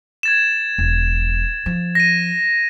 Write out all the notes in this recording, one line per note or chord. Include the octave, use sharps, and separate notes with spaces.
G#6 A6 E7
E1
F3
A#6 D#7